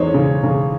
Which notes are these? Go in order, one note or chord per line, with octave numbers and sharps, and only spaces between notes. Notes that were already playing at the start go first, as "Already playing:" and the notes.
Already playing: E2 G#3 D#4 C5 C#5
C#3
C#3